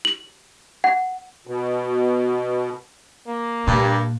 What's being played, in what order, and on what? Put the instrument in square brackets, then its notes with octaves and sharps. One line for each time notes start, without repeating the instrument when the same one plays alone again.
[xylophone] F#7
F#5
[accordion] B2
[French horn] A#3
[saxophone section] G2 [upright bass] A#2